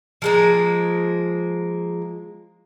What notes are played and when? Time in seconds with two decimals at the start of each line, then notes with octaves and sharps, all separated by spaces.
0.22 F3 G#3 A#3